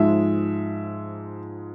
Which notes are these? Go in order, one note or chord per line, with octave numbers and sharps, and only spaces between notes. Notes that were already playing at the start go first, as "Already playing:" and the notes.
Already playing: G#2 F3 G#3 E5